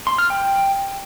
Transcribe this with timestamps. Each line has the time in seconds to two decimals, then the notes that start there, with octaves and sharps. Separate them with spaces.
0.07 C6
0.18 F6
0.30 G5